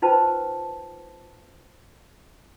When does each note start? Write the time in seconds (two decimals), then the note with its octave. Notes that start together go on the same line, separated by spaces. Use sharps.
0.02 D#4 F4 B4 C5 G5 A5